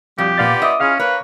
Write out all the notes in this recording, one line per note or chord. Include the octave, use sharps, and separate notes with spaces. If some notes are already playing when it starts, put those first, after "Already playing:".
F2 B2 G3 G4
A#2 B3 F4 D5 F5 A6
D#5 E5 D6
C#4 E4 F4 G#4 F5 F6
A#3 B4 C#5